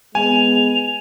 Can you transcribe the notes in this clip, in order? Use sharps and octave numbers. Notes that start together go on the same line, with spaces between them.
G#3 B3 G#5 F7